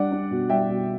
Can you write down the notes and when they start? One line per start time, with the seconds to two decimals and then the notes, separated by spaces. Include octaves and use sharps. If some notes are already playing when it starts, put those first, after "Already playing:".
Already playing: G3 D4 D5 F#5
0.12 D4
0.31 B2
0.49 G3 E5 G5
0.69 B2